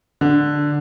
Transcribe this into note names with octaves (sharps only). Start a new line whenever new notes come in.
D3